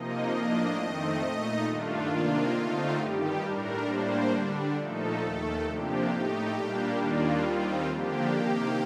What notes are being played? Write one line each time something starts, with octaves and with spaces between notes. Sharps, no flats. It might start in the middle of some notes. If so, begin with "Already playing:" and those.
Already playing: C3 F3 A#3 D#4 D#5
A2 F3 A#3 D4 D#5
F2 D#3 A3 C4
A#2 A3 D#4 D#5
G2 D#3 A3 D4 F4
C3 D#3 A#3 D4
D3 A3 C4 D#4 F4
G2 D#3 G3 G4
A2 G3 D4 A#4
A2 G3 A#3 D4 C5
D3 G3 D4
A#2 F3 A3 D#4 A4
D#2 D#3 A3
C3 F3 A#3 D4 G4
A2 A3 D#4
A#2 G3 A#3 D4
D#2 D#3 G3 A#3 D4 F4
D#2 D#3 G3 C4
D3 F3 A#3 D4 G4
C3 D#3 A#3